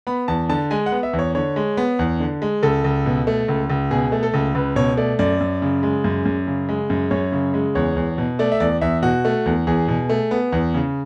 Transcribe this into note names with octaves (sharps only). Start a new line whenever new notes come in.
B3 B5
E2 A5
D3 A5
G#3 G#5
F#5
B3
E5
E2
C#5
D3 C#5
G#3
B3
E2
D3
G#3
C#2 A4
C#2
B2
A3
C#2
C#2
B2 G#4
A3
A4
C#2
C#2 B4
B2 C#5
A3 D5
F#2 D5
F#2
C#3
G#3
F#2
F#2
C#3
G#3
F#2
F#2 C#5
C#3
G#3
E2 C#5
E2
B2
A3 D5
E5
E2 D5
E2 E5
B2 F#4
A3
E2
E2 G#4
B2
A3
B3
E2
C#3